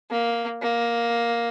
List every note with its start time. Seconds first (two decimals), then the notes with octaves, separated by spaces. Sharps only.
0.11 A#3
0.62 A#3